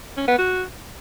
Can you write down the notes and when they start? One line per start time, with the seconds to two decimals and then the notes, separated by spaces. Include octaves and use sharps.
0.17 C#4
0.28 B3
0.38 F#4